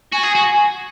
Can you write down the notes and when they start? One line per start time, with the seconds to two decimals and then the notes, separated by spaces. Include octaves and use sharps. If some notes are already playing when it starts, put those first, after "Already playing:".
0.12 F#4 G#5
0.23 G#4
0.35 F#4